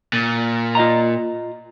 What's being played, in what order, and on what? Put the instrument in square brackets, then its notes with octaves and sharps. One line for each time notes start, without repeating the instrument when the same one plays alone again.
[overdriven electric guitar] A#2
[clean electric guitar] F4 D#5 A#5